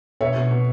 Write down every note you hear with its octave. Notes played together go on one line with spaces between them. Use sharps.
B2 C#5 E5
B2
B2